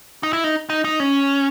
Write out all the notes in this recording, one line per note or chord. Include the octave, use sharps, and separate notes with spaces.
D#4
E4
D#4
D#4
D#4
C#4